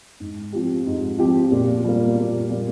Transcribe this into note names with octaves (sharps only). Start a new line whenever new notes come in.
G#2
F3 C4 G4
G#2
F3 C4 G4
A#2
G3 A#3
A#2
G3 A#3